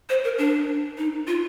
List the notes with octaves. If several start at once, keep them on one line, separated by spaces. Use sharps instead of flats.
C5
A#4
D4
D#4
F4